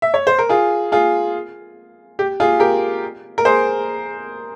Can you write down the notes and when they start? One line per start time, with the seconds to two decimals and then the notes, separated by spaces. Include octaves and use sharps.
0.02 E5
0.14 C#5
0.27 C5
0.39 A#4
0.49 F4 G#4
0.92 F4 G#4
2.19 G4
2.40 F4 G#4
2.60 G4 A#4
3.38 A#4
3.45 G#4 C5